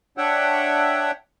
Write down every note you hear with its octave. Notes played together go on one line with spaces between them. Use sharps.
D4 C#5 E5 F#5 G5